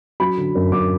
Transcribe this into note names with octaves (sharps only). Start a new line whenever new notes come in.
F#3 B5
D3
F#2
F#2 D6